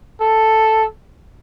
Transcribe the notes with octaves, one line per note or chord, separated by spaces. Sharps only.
A4